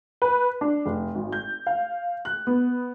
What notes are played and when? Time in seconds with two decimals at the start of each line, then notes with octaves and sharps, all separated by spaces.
0.22 B4
0.61 D4
0.86 F1
1.15 G#1
1.32 G6
1.67 F5
2.25 F#6
2.47 B3